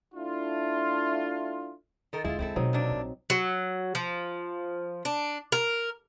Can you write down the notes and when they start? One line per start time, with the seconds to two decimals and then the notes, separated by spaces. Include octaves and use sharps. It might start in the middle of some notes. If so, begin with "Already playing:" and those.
0.14 A3 D4 E4 F4
2.13 D#3 A4 A#4 D#5
2.24 D2 G#3 E4 F4
2.39 C#2 D3 C4 E4 A4
2.56 B2 D#3 F#3 C4 D#4
2.73 C3 A#3 D4
2.91 A#1
3.30 F#3
3.95 F3
5.05 D4
5.52 A#4